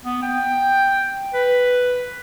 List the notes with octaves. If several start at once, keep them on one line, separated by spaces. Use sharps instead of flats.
B3
G5
B4